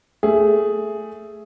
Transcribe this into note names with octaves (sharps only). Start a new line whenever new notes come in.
A3 G#4